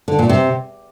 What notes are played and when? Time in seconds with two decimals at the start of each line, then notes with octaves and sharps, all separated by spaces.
0.08 D3
0.19 A#2
0.29 C3